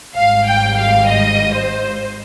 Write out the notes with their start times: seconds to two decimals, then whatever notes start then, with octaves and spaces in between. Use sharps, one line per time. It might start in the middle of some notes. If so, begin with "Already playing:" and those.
0.16 G#1 G#2 G3 F5
0.47 G5
0.78 F5
1.08 D#5
1.53 C5